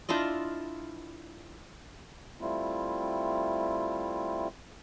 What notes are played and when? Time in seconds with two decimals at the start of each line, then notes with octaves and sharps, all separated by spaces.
0.09 D4 E4 F4 D#5
2.41 G3 A3 C4 E4 F4